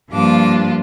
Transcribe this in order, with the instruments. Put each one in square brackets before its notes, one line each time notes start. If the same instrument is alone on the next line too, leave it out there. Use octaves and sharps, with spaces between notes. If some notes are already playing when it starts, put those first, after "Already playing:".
[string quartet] G2 F3 A#3 D4 F4 D6